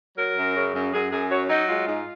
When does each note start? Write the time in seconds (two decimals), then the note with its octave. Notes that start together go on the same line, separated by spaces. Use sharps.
0.17 F#3 A#4
0.36 F#2
0.54 C#3
0.73 F#2
0.92 F#2 G#4
1.11 F#2 G#4
1.29 F#3 C#5
1.48 F#3 D#4
1.67 G#3 F4
1.86 G#2